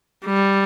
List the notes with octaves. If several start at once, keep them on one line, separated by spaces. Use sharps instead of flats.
G3